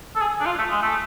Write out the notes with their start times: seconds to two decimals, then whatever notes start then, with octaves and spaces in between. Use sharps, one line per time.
0.15 A4
0.22 G#4
0.41 D4
0.46 F4
0.58 A3
0.71 G#3
0.82 A3